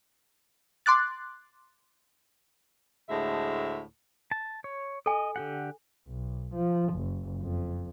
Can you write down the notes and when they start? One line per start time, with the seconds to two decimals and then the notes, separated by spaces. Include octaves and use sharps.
0.86 C6 D6 F#6 A6
3.09 D2 A2 G#3 C5 E5
4.31 A5
4.64 C#5
5.06 A4 D#5 G#5
5.36 D3 G4 F#5
6.07 B1
6.54 F3
6.94 F#1
7.42 F2